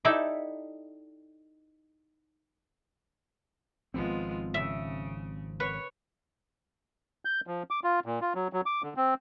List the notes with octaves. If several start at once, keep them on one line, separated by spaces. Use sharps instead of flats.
D#4 E4 G4 A4 D5 E5
G#1 F3 G#3 B3 C4 F4
C#3 E5
B4 C#5
G6
F3
D6
F4
A#2
F4
F#3
F#3
D6
D3
C4